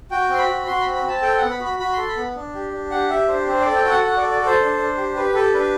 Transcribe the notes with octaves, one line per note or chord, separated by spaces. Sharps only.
F#4 G5
C4 C6
B5
F#4
F#4 C6
C4 B5
B5
C4 A5
A4 G5
B3 F#5
B5
F#4
B5
F#4 B5
A4 C6
B5
B3
D4
G4
D4
G4 F#5
G4 E5
D4 C5
C4 C5
D5
A4
G5
F#4 F#5
F#4 F#5
D5
A4
D5
A4
C5
D4
D4
G4
G4 B4
G4 A4
D4 B4